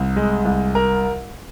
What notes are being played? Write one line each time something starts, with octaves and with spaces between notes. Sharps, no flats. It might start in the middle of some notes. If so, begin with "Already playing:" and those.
Already playing: C2
G#3
C2
A#4